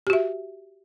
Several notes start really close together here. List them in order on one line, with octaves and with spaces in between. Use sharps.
G4 F#4 E5